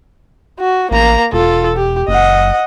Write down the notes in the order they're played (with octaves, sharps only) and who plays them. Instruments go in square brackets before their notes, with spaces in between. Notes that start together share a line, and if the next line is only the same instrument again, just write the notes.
[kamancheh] F#4
[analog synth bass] A1 [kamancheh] A#3 A#5
[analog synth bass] E1 [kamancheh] F4 A4
[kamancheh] G4
[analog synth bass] F#1 [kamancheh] D#5 F#5